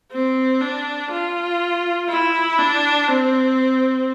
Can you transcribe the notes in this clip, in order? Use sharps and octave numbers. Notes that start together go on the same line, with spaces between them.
C4
D4
F4
E4
D4
C4